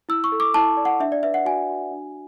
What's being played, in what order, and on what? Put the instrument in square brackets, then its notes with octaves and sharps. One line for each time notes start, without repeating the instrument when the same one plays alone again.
[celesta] E4 E6
C#6
A4
D6
E4 A5
D5
F#5
D4 E5
D5
B4 E5
F#5
F#4 G#5
F#4
D4